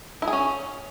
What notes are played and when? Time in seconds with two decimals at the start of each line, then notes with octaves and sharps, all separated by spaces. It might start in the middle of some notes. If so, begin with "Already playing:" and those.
0.22 E4
0.28 G#4
0.33 C#4